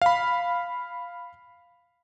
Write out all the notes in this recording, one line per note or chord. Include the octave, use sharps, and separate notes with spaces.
F5 B5